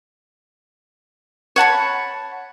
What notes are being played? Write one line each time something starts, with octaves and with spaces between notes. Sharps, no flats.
C#5 F#5 A5 B5